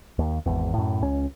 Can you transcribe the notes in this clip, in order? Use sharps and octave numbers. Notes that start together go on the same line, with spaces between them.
D#2
G#1 E2
F#2 A2
C#2 C#4